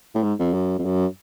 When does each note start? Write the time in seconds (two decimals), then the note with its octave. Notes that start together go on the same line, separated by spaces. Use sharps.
0.15 A2
0.23 G#2
0.39 F2
0.53 F#2
0.78 F2
0.85 F#2